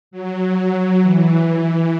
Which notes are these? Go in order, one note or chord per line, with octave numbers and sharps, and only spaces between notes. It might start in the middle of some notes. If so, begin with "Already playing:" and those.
F#3
F#3
E3